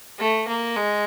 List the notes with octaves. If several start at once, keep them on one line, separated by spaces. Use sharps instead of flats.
A3
A#3
G#3